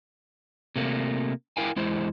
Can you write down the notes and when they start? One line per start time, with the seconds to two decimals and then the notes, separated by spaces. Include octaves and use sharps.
0.76 C3 A3 A#3
1.57 E4 A#4 F5 G5 G#5
1.76 E2 G#3 E4 C5